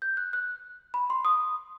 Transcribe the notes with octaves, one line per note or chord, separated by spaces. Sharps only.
G6
F#6
F#6
B5
C6
D#6